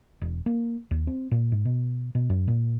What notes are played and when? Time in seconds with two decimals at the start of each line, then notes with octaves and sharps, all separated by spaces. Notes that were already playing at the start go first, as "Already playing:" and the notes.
0.21 E1
0.46 A#3
0.91 D#2
1.07 C4
1.31 A#2
1.52 G#2
1.65 B2
2.15 B2
2.30 F#2
2.48 A#2